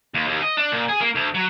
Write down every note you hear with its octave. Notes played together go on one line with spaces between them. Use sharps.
D#2
D#2
D#5
D4
A#2
G#4
A#3
D2
F#3